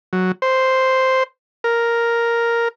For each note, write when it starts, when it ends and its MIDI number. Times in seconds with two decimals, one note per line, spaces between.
0.13 0.32 54
0.42 1.23 72
1.64 2.68 70